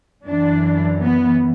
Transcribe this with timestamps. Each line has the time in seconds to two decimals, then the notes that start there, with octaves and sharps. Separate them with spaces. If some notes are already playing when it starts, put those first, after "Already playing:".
0.24 F#2 E3 D4
1.02 B3